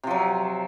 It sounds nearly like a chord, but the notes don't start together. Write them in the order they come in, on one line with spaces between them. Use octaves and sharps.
C3 F3 F#3